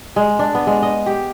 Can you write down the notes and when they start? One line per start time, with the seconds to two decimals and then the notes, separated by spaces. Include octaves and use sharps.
0.16 G#3
0.39 D4
0.55 B3
0.67 G#3
0.83 D#5
1.06 G4